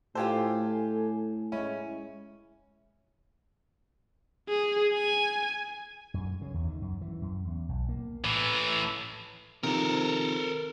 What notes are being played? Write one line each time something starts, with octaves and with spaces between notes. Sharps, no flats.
A2 F4 G4 A4 C5 G#5
G#3 C#4 E4
G#4
G#5
F#2
C#3
E2
D#3
F#2
E3
F#2
E2
B1
A#3
A2 E3
C3 D#3 F3 A4 A#4